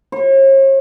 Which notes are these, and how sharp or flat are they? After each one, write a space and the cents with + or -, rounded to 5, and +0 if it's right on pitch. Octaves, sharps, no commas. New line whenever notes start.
C#5 -45